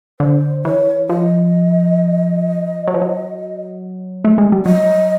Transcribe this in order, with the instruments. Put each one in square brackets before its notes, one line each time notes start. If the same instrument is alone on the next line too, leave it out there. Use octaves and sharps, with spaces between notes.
[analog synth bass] D3 [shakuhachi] C5
[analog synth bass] E3 [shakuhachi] C#5
[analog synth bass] F3 [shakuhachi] D#5
[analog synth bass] F#3
F3
F#3
A3
G#3
G3
[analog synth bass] F#3 [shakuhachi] D#5